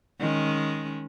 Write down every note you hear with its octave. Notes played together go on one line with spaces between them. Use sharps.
D#3 G#3 C#4